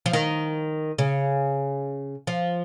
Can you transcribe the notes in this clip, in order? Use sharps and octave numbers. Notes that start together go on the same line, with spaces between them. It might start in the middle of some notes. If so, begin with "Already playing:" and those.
F3
D#3
C#3
F3